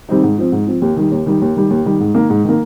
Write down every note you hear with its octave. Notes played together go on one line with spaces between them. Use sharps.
D#3 G3 C4 D#4
G#2
F3 C4
G#2
F3 C4
D#2
D#3 G3
D#2
D#3 G3
D#2
D#3 G3
D#2
D#3 G3
G#2
D#3 A#3
G#2
D#3 A#3